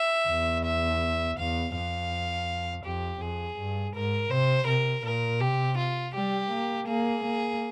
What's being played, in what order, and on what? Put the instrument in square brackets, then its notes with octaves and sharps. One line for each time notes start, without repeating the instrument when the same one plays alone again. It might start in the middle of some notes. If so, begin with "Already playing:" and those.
Already playing: [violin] E5
[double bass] E2
[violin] E5
[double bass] E2 [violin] F5
[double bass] F2 [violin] F5
[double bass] F2 [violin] G4
[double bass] F2 [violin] G#4
[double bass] G2
[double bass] G#2 [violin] A#4
[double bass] C3 [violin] C5
[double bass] C3 [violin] A#4
[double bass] A#2 [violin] A#4
[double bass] C3 [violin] G4
[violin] F4
[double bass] G3 [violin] G4
[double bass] A#3
[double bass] A#3 [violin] G#4
[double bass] A#3